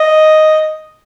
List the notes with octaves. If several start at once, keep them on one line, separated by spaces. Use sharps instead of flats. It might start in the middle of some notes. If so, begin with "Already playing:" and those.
Already playing: D#5